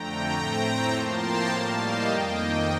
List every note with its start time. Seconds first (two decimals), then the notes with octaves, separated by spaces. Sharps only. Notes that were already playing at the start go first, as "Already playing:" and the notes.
Already playing: F2 D3 A3 G5 A#5
0.33 A2 A3 C4
0.62 G5 A#5
0.91 A2 F3 A#3 A5 C6
1.20 G5 A#5
1.49 A2 G3 A#3 F5 A5
1.77 D#5 G5
2.06 F2 D#3 A#3 D#5 G5